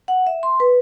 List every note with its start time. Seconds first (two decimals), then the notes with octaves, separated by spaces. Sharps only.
0.08 F#5
0.27 E5
0.43 C6
0.60 B4